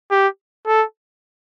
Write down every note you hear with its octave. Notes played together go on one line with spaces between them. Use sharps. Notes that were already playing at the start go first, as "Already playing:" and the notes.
G4
A4